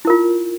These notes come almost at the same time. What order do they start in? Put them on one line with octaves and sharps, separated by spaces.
E4 A#4 F4